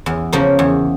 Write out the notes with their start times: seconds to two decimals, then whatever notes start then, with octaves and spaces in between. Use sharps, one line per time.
0.06 E2
0.33 C#3 F3 A#3
0.59 E2